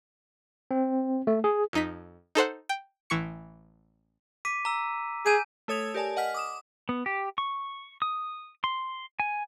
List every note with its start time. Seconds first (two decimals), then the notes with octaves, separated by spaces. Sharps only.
0.71 C4
1.27 A3
1.44 G#4
1.73 F2 D#4 B6
2.35 D#4 A4 C5 F#5
2.69 G5
3.10 A1 E3 C#6 C#7
4.45 D6 B6 D#7
4.65 A#5 E6
5.26 G#4 G#5 G6 D#7
5.68 A3 A4 C#5 D#6 G#6 F7
5.94 G4 A#4 D5 G#5 A5
6.16 D#5 F#5 G#5 F6 B6
6.34 D6 D#6 E7
6.89 B3
7.06 G4
7.38 C#6
8.02 D#6
8.64 C6
9.20 G#5